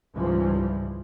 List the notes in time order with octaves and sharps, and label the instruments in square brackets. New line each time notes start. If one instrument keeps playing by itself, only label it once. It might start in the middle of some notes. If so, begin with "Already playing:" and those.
[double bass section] C#2 G#2 E3 F3 G3